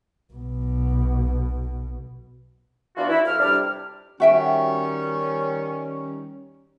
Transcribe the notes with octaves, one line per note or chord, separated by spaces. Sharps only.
B1 B2
E3 B3 D4 F4 F#4
E4
F2 F6
C3 G3 D4 D6 F6
D#3 G3 C#4 F#4 E5 G5